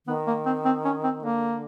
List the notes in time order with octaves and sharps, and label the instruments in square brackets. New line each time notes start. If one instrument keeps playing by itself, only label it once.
[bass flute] D#3 [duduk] B3
[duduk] A#3
C4
C4
C#4
C4
[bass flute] D3 [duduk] A#3